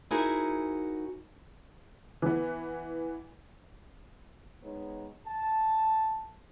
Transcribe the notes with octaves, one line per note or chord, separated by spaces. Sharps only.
D#4 E4 F#4 G#4 A#4 C5
E3 B3
G#3 B3 D#4 C#5
A5